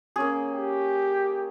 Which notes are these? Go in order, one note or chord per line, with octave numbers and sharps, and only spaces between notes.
A#3 C#4 G#4
G4